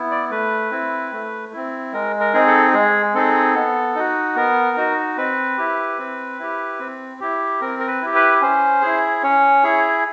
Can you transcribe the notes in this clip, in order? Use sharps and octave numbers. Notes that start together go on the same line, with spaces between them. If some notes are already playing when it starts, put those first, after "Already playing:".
Already playing: B3 E4
D5
A3 B4
C4 E4
A3
C4 E4
G#3 A#4
A#4
C4 D#4 G#4
A4
G#3 G#4
C4 D#4 G#4 A4
B3
D#4 F#4
B3 A#4
D#4 F#4
C4 B4
E4 G4
C4
E4 G4
C4
E4 G4
C4 A#4
A#4
B4
E4 G4
B4
C#4 C5
E4 G#4
C#4 C#5
E4 G#4